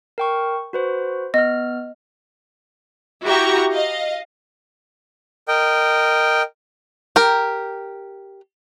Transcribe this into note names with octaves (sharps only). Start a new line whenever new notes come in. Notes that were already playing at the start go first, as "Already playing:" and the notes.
A#4 G5 C#6
F#4 B4 C5
B3 D#5 F6
E4 F#4 G4 E5 A#5 C#6
D#5 F5
A#4 D#5 G5
G4 A#4